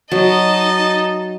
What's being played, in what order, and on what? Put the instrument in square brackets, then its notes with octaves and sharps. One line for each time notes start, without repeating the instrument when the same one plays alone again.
[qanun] F#3 [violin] D#4 D#5 [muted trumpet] A5